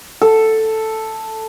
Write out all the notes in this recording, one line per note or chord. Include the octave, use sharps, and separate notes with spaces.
A4